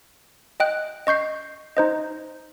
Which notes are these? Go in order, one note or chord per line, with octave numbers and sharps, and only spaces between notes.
D#5 G5 F#6
D#5 C#6 G6 C7
D#4 C5 D#5